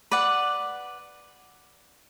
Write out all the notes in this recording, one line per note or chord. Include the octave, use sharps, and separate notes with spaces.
B4 D5 F#5